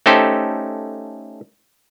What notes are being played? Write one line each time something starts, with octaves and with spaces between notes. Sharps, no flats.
A3 C#4 D#4 G4 A4 C5